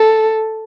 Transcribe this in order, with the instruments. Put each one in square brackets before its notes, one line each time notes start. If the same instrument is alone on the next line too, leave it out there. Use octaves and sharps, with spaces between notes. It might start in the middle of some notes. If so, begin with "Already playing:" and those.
Already playing: [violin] A4